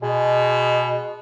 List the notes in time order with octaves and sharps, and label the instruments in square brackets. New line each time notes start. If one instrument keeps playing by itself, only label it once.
[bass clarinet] B2 [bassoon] G#3